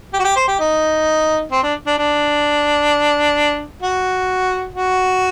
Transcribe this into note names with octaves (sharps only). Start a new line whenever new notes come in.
G4
F#4
G4
C5
G4
D#4
C4
D4
D4
D4
F#4
F#4